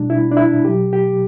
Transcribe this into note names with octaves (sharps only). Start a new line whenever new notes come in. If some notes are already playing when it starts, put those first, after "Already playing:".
Already playing: B2 G3 D4
E4
D4
E4
B2 F#3 G4
G4